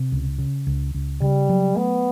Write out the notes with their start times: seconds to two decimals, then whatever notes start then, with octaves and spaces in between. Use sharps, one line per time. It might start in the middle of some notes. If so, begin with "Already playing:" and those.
Already playing: C3
0.12 C#2
0.38 C#3
0.67 C#2
0.94 C#2
1.21 C#3 G3
1.49 F#3
1.77 A3 B3